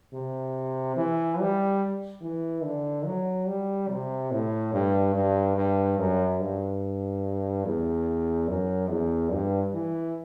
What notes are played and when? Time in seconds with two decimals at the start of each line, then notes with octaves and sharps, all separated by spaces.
0.14 C3
0.96 E3
1.39 G3
2.22 E3
2.64 D3
3.06 F#3
3.47 G3
3.89 C3
4.31 A2
4.73 G2
5.15 G2
5.57 G2
5.98 F#2
6.39 G2
7.65 E2
8.48 F#2
8.90 E2
9.32 G2
9.74 E3